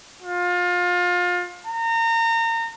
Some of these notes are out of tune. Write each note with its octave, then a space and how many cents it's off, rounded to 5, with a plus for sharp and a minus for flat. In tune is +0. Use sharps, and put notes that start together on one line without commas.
F4 +30
A#5 -30